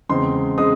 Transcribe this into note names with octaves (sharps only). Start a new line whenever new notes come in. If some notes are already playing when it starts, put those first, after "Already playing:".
E2 C#3 G#3 C4 C6
C#3 G#3 C4 D#6